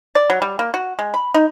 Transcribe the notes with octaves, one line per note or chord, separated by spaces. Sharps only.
D5
F#3
G3
A#3
F#4
G#3
B5
D#4